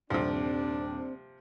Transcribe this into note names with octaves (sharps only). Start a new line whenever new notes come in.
D#1 G2 C3 F3 C4 D4